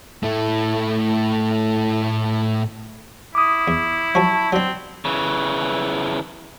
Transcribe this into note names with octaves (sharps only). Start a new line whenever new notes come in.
A2 A3
E4 D6 D#6
E2
F3 F#3 A5 C#6
F#3 C4 D4
C#3 E3